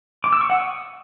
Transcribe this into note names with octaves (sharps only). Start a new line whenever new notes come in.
D6
E6
C#6
F#5
D#6